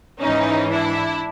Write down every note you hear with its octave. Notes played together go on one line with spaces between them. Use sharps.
G#2 E3 C#4 D#4
D4 E4